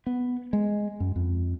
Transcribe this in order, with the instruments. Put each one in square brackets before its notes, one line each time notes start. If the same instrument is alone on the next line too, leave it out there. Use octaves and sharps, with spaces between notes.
[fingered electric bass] B3
G#3
F#2
F2